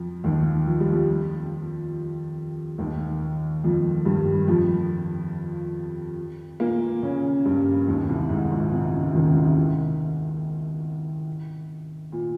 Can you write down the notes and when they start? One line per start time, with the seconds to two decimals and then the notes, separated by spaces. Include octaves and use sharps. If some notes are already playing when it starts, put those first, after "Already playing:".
Already playing: F2 F3
0.24 D#2 D#3
0.66 F3
0.80 G3
0.92 F2 F3
2.78 D#2 D#3
3.64 F2 F3
4.05 G2 G3
4.48 F2 F3
6.60 A#2 A#3
7.03 C#3 C#4
7.45 G2 G3
7.88 D#2 D#3
8.09 C2 C3
8.30 G#2
8.52 A#1 A#2
8.73 C2 C3
8.94 C#2 C#3
9.15 D#2 D#3
9.36 C2 C3
12.12 A#2